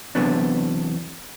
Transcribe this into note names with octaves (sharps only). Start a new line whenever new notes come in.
E2 C3 F#3 B3 D4